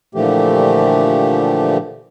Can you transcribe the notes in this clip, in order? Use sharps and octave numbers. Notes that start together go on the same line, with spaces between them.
A#2 D3 E3 F3 A3 G4